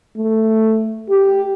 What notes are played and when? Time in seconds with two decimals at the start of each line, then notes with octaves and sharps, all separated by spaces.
0.16 A3
1.10 G4